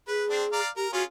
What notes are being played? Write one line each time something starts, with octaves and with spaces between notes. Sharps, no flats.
G#4 B4
C4 D4
D5 F5 A#5
G4 A#4
C#4 F4 F#4 G#4